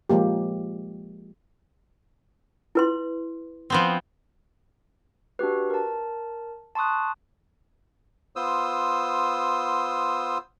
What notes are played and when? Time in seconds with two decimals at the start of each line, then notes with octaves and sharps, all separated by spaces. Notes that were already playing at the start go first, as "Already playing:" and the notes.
0.09 F3 G#3 A#3 G4
2.75 E4 B4 C6
3.70 F3 B3 C4
5.39 D4 F#4 G4 B4
5.70 A#4 A5
6.75 A5 C6 C#6 D#6 F#6
8.36 B3 F4 C5 D#6 E6